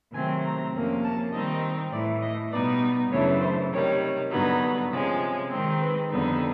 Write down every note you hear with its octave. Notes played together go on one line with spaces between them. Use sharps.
C3 D#3 F#3 A3 C4 G#5
A#5
F2 C3 F3 A#3 C#4
A5
D#3 G3 C4 D#4 D#5
A2 E3 A3 D5
D#5
B2 G3 B3 D#4 D5
F#2 C#3 E3 A3 D4 C#5
C5
C3 D#3 G3 C#5
G2 D3 F#3 B3 D#4
C3 F3 G#3 C#4
D#3 G#3 C4 D#4
B4
F2 D3 G3 B3 D#4